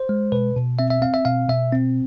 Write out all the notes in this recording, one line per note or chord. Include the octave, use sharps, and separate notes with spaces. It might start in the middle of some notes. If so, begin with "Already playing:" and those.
Already playing: C5
G#3
B2 B4
B2
C4 E5
E5
C4 F5
E5
B2 F5
B2 E5
C4